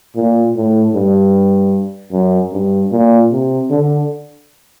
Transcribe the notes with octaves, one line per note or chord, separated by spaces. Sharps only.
A#2
A2
G2
F#2
G2
A#2
C3
D3